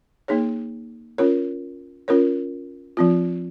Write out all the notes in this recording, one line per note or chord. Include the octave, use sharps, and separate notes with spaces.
A#3 D#4 G#4 C#5
C#4 F4 A#4 C#5
C#4 F4 A#4 C#5
F3 C4 F4